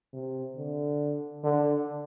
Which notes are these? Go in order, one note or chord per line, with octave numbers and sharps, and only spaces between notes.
C3
D3
D3